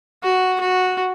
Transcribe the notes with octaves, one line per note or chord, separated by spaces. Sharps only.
F#4
F#4